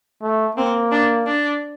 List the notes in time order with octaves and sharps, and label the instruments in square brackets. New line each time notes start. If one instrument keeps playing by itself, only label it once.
[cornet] A3
[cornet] A#3 [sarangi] C4
[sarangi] D4
D4